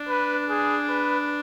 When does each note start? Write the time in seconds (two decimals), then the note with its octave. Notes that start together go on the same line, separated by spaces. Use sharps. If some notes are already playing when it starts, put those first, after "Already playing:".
Already playing: D4
0.09 B4
0.49 G#4
0.89 B4